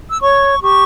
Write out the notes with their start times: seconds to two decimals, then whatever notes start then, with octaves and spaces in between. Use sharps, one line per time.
0.11 E6
0.22 C#5 C#6
0.63 G4 C#6